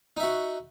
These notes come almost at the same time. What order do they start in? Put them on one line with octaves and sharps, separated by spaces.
D#4 E5 F#4